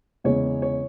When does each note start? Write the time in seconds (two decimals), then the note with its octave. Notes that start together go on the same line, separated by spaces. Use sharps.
0.24 E2 C#3 E3 G#3 C#5
0.62 C#5